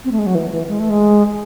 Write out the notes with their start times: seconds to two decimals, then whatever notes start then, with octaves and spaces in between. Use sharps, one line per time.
0.05 C4
0.12 A3
0.19 G#3
0.26 F#3
0.35 E3
0.51 E3
0.69 G#3
0.79 A3
0.90 G#3